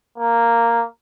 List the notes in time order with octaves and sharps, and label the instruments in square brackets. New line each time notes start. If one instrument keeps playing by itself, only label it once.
[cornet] A#3